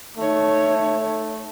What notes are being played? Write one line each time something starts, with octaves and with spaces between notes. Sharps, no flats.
A3 D#4 C#5